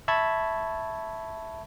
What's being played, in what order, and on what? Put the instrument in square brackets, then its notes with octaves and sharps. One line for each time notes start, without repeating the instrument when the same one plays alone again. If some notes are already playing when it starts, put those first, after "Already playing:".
[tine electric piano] E5 A5 B5 C#6 G#6